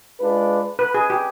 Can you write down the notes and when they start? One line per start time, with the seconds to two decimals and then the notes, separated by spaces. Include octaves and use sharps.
0.19 G#3 D4 F4 B4
0.79 B4
0.94 G#4
1.10 G4